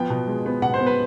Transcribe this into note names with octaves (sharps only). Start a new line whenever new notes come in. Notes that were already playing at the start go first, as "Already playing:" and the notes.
Already playing: F3 B3 G5
B2
G#3
B3
B2 F#5
C5
B3
B4